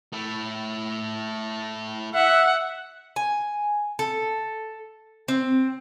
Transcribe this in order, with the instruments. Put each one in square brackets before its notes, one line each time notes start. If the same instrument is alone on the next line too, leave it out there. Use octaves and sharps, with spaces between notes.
[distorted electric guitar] A3 E4
[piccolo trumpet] E5 [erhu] F#5
[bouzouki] G#5
A4
C4